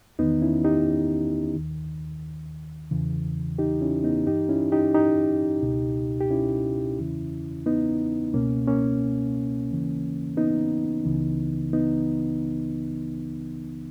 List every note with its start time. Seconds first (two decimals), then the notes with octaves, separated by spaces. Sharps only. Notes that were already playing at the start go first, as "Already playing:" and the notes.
0.19 E2 D#3 B3 D#4
0.42 C#4 E4
0.64 D#4 G4
1.55 D#2 D#3
2.91 E2 C#3 E3
3.58 D#4 G4
3.81 C#4 E4
4.04 B3 D#4
4.26 G2 E3 D#4 G4
4.49 C#4 E4
4.72 D#4 G4
4.94 D#4 G4
5.63 C#2 B2
6.20 G4
6.30 C#4 E4
6.99 E2 C#3 E3
7.66 B3 D#4
8.33 C#2 B2 A#3 C#4
8.68 A#3 C#4
9.69 D#2 C#3 E3
10.37 B3 D#4
11.05 C#2 C#3 E3
11.73 B3 D#4